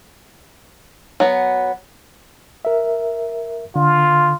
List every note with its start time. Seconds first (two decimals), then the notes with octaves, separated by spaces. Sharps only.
1.20 F#3 B3
2.65 A#4 E5
3.76 D3 F4